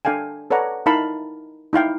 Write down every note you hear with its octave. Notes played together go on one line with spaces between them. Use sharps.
D4 A4 F5 G5 G#5
A4 B4 C#5 D5 F#5 A#5
D#4 E4 A#4 F5 A5 B5
D#4 E4 F5 G5